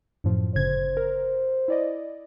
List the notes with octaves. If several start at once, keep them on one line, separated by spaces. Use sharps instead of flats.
F#2 A2 F3
G1 C#3 C5 G#6
A#4
E4 D5 D#5